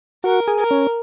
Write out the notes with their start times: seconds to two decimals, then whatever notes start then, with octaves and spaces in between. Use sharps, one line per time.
0.24 F#4 A#4
0.48 G#4
0.59 A#4
0.71 C#4